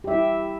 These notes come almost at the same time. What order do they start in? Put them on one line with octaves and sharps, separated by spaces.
G4 E5 E4